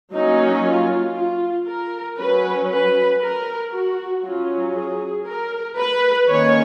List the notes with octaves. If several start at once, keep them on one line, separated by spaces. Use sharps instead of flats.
F#3 A#3 C#4 D#4
F4
F4
A#4
F#3 C#4 B4
B4
A#4
F#4
F#3 C#4 F4
G#4
A#4
B4
D#3 A#3 C#4 C#5